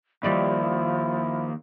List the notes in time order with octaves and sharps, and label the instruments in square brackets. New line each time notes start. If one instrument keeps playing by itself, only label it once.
[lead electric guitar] D#2 [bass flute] F3 [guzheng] G3 D5 D#5 [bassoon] E4